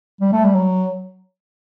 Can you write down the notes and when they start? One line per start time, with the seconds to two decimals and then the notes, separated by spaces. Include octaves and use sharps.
0.21 G3
0.32 A3
0.44 G3
0.55 F#3